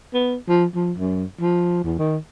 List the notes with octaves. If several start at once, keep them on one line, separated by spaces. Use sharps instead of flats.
B3
F3
F3
F#2
F3
E2
D#3